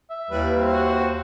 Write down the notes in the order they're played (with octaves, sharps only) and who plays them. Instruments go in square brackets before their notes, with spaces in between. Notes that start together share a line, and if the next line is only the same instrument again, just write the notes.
[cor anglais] E5
[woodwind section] D#2 [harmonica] E3 G3 B4
[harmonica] C4
[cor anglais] F#4